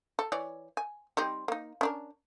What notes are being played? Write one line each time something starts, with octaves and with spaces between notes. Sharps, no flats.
A4
E3 C#5 D5
G#5
G3 C4 D#4
A#3 D#4
C#4 D4 A#4